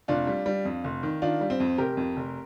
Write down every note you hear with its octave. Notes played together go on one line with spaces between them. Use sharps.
F1 D4 F4
G3
G3
F2
F1
D#3
D#3 D4 F4
G3
C4
F2
F1 G4 A#4
F2
F1